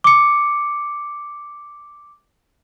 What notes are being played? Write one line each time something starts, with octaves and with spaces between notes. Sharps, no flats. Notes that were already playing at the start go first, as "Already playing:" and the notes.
D6 C#7